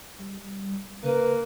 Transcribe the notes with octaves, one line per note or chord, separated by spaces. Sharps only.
G3
C#3 A#3 B4